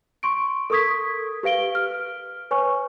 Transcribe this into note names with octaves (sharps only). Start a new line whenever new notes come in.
C6 C#6 D7
A4 A#4 C#6 D#6 G#6 B6
G4 B4 F5 D7 G7
F6
B4 C#5 G#5 C#6